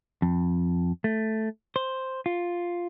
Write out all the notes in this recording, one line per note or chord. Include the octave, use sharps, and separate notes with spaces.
F2
A3
C5
F4